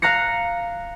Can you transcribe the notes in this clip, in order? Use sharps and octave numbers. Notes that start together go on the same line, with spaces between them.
F5 A#5 F#6 A#6 C#7